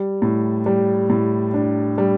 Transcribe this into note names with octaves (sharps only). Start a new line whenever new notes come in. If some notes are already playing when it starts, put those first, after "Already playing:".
Already playing: G3
A2
G3
A2
D4
G3